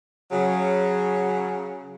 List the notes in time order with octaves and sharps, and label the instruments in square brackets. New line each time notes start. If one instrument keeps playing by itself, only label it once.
[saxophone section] C#3 F#3